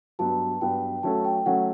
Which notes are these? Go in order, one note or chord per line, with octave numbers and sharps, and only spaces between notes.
G2 F#3 B3 A5
G2 F#3 B3 G5
F#3 A3 C#4 F#4 A4 A5
G5
F#3 A3 C#4 F#4 A4 F#5